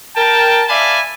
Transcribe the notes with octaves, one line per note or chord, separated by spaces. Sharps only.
A#4 G5 A5
D5 E5 F5 G#5 A5 B5